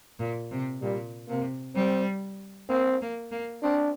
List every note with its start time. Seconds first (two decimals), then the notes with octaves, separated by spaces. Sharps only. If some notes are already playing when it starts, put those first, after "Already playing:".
0.19 A#2
0.51 C3
0.81 A#2 G3
1.28 C3 A#3
1.75 G3 C4
2.68 A#3 C4
3.01 A#3
3.31 A#3
3.63 C4 D4